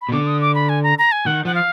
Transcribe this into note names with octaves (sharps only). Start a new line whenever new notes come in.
B5
B2
D3 D6
D#6
D6
B5
G#5
A#5
A#5
G#5
D#3 F#5
F3 F#5
F5